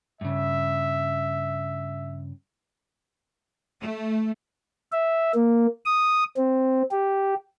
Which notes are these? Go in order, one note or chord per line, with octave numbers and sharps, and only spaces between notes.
G2 C#3 E5
A3
E5
A#3
D#6
C4
G4